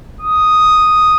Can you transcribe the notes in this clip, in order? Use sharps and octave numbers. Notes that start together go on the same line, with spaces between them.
D#6